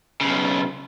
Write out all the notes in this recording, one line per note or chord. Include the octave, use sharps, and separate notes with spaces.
B1 C#3